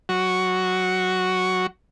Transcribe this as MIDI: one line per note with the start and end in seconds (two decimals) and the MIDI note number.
0.09 1.66 54
0.09 1.66 66
0.09 1.66 85